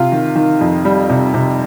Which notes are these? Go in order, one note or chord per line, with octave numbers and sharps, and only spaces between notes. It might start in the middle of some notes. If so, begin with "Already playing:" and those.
Already playing: C3 F4
D#3
D#3
F2
G3
C3
C3